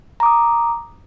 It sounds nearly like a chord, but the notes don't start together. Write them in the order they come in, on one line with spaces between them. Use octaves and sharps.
A#5 D6 D#6